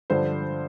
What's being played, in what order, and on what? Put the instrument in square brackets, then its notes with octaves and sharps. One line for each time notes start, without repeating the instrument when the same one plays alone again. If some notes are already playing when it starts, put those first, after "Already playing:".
[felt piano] G2 D3 F3 C5